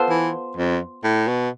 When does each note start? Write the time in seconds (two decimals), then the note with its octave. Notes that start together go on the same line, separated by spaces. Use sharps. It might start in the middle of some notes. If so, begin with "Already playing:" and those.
Already playing: B3 F4 A4 C5
0.10 E3
0.57 F2
1.04 A2
1.28 B2